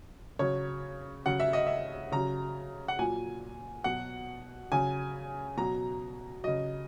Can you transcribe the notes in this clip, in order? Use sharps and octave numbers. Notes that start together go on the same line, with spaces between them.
C#3 F#3 C#5
C#3 F#3 F#5
E5
D#5
E5
C#3 F#3 A#5
F#5
A#2 F#3 G#5
B2 F#3 F#5
C#3 F#3 G#5
B2 F#3 A#5
C#3 F#3 D#5